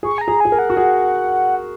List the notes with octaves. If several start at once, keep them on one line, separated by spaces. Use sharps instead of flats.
G#4 C#6
G#5
A#5
G#4
G#4 G#5
A#4
F#5
F#4
G#4